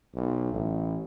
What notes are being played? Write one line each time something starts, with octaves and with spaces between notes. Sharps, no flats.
B1
A1